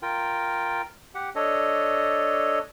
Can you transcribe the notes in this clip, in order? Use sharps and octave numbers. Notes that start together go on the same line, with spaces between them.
F4 A#4 G5
G4 F#5
D4 A4 C#5 D#5